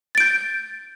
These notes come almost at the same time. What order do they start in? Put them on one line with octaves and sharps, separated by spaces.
A6 D7 G6